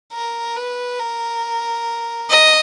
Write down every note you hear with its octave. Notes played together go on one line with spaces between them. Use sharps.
A#4
B4
A#4
D#5